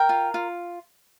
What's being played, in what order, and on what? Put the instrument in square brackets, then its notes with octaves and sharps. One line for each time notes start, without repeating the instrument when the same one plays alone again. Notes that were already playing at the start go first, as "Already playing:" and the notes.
Already playing: [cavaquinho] A#4 G5
F4
F4